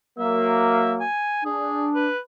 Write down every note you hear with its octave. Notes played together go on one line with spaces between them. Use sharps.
F#3 A#3 E5
G#5
D4 G#4
B4